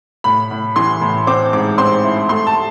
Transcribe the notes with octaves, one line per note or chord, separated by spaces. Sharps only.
A2 B5
A2
E3 C6
A2
C4 D6
G#2 D6
C4 C6
E4
A3 C6
A5